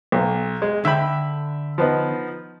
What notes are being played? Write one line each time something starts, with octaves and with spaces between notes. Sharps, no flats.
B1
G#3
D3 E5 G5 B5
F3 B3 D#4